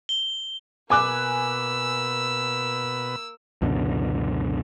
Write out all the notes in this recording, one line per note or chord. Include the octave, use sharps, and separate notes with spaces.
G7
B2 A#3 B4 G#5 D6 E6 F#6
C#2 F#2 B2 D3